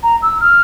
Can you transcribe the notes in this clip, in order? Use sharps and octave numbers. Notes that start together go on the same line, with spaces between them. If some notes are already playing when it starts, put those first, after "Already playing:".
A#5
E6
F6